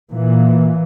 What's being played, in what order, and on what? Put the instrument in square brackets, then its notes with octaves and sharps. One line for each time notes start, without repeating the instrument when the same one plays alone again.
[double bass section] A#2 E3